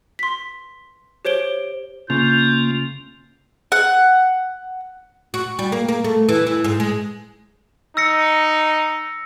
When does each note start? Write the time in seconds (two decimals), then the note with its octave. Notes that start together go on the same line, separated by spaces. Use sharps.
0.19 C6 B6
1.25 G4 C5 C#5 D7 G7
2.10 C#3 A#3 F4 G6
3.72 F#5
5.34 F#4
5.59 G3
5.72 A#3
5.88 A#3
6.04 A3
6.29 E3
6.47 E3
6.64 G#2
6.80 G#3
7.97 D#4 E6 A#6 C#7